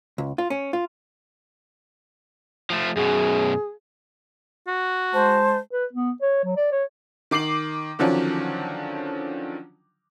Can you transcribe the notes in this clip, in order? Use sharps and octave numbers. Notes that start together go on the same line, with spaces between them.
C#2
F4
C#4
F4
F3 A3
F#2 B2 G#4
F#4
G#3 C5 A5
B4
B3
C#5
F#3
D5
C#5
D#3 D6 C7 F#7
D3 D#3 F3 F#3 C#4 D4